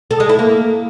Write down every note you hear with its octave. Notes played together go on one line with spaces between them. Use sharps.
A4
G#3
E4
A#3